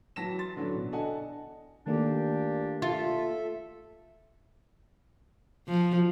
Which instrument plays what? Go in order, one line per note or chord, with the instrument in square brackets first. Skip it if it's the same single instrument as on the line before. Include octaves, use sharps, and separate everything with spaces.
[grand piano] E3 F#3 A5 A#6 B6 E7
C6 A6
D3 E3 F#3 C#4 D4
B2
D4 A4 D#5 F#5 G#5 A5
[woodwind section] A#2 D4 G4 [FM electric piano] D#3 A3 A#3
[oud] F4 [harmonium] A4 E5
[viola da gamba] F3